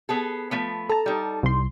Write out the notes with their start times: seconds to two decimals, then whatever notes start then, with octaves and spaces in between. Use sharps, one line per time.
0.09 B3 G#4 A4
0.51 F3 A3 B3
0.89 A4 A5 A#5
1.06 G3 D#4
1.43 C2 C6